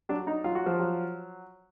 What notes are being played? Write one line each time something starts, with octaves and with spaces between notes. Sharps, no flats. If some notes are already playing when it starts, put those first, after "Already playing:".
F#3 D4
D#4
F#3 F4
F#4
F3 F4
F#3